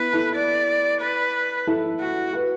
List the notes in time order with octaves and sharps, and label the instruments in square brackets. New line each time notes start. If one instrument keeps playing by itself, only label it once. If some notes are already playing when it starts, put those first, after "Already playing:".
Already playing: [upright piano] B3 E4 [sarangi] B4
[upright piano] E4 A4
[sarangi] D5
B4
[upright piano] E4 A4
[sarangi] F#4
[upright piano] F#4 B4